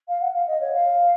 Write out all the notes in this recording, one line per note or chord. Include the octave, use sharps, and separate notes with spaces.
F5
F#5
F5
D#5
C#5
F5